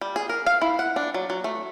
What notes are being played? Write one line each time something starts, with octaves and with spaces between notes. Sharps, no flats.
G3
G#4
A#4
F5
E4
F#5
D4
F#3
F#3
A3